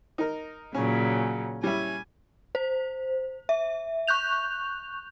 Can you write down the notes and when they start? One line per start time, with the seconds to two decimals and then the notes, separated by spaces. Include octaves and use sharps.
0.18 D#4 A#4
0.75 A#2 C#3 F#3 C#4
1.64 G3 C#4 E4 G#5
2.55 C5
3.49 E5
4.07 C#6 F#6 G6 F7